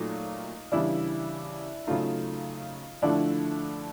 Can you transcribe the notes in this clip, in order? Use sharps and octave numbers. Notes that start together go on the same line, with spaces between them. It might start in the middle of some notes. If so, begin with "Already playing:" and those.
Already playing: A#2 F#3 A3 D#4 F4
C#3 E3 G3 D4 E4
C#3 F#3 A3 D#4 F4
D3 F3 A3 D4 E4